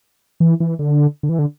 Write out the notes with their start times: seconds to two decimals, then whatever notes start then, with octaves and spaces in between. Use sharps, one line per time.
0.40 E3
0.60 E3
0.79 D3
1.23 D3
1.29 E3
1.39 D3